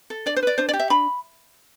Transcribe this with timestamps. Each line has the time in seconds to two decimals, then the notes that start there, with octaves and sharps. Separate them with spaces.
0.10 A4
0.26 D4 D5
0.36 C5
0.43 B4 D5
0.58 D4 C5
0.69 D5
0.73 G4
0.79 E5
0.90 D4 B5